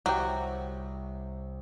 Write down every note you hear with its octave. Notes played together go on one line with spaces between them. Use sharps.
C2 F#3 F#4 G4